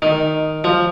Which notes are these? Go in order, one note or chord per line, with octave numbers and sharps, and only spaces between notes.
D#3
F3